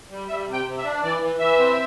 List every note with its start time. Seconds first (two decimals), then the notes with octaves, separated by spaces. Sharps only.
0.10 G3
0.28 G3 E5
0.47 C3
0.53 G5
0.65 C3
0.78 E5
0.83 D4
1.03 E3 D5
1.21 E3
1.39 E3 E5
1.59 C4